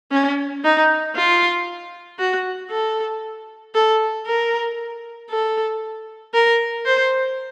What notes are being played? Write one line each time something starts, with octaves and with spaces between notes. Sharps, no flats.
C#4
D#4
F4
F#4
A4
A4
A#4
A4
A#4
C5